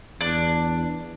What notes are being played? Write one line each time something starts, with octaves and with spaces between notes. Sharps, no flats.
E2 D4